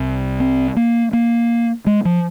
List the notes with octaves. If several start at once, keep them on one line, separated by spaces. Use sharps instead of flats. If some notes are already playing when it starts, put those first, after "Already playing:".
Already playing: C2 C3
C4
A#3
A#3
G#3
F3